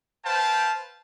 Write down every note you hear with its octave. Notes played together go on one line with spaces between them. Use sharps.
B4 C5 F5 G5 A5